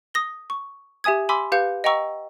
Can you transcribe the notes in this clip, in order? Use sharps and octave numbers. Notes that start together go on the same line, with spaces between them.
D#6 A#6 G7
C#6
G4 E5 G#5 D#6 G#6
G#5 B5 C6 D6 E6 B6
G4 B4 F5 G6 C#7
D#5 F#5 G5 A#5 C#6 E6